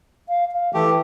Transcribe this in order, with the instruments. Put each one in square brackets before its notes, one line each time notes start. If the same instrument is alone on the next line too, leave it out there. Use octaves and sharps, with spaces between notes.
[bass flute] F5
F5
[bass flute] E3 [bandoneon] A3 G4